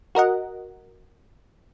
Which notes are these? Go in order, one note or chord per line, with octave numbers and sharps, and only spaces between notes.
F#4 A#4 D#5 F#5